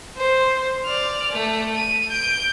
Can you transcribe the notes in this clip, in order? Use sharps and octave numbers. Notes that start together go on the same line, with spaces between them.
C5
D5 F6
A3
D#7
G6 D7